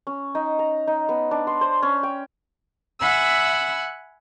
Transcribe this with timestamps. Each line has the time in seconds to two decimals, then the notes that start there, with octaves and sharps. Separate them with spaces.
0.07 C#4
0.35 D#4
0.59 A#5
0.87 D#4
1.09 B3
1.31 D4
1.47 C6
1.61 C5
1.82 C#4
2.03 G5
2.99 E5 F#5 G#5 B5 E6